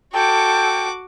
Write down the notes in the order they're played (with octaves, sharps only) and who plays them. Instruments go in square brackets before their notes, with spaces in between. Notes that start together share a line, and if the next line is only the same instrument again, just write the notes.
[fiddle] F#4 D6 [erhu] A4 [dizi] G5